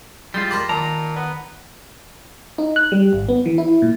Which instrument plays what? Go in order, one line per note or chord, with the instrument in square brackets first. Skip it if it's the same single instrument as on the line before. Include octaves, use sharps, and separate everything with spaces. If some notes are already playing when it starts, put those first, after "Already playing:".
[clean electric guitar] G3 G#3 F4 [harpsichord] C6
[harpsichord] A#4 A5 B5 [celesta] C6 D6
[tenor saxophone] A#2 [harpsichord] D#3 [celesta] A5 [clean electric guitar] A#5
[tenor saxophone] B3
[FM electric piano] D#4
F#6
G3
G#1
B3
E3
E4
A#2